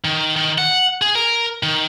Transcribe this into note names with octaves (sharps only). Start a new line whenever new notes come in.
D#3
D#3
F#5
G#4
A#4
D#3